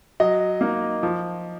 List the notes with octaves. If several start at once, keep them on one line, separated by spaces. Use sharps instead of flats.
F#3 D#5
A#3 D#4
F3